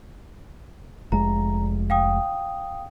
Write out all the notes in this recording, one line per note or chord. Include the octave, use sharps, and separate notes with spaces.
F1 G#3 A#5
F5 G5 D#6